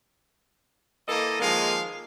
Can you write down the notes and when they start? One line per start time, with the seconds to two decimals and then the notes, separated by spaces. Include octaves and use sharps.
1.08 E3 A#3 A4 D#5
1.40 D#3 F3 G#3 A#3 F5